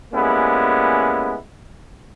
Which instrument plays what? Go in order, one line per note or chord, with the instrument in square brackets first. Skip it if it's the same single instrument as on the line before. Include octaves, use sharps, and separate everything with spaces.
[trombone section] G3 G#3 A#3 B3 C#4 E4